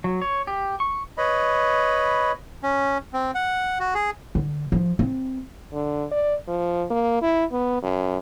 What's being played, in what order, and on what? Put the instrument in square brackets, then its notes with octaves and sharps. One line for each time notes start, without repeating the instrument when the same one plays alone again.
[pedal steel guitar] F#3
C#5
G4
C#6
[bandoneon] B4 C#5 D#5 B5
[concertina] C#4
C4
F#5
F#4
G#4
[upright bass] D3
F3
C4
[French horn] D3
D5
F3
A#3
E4
B3
F#2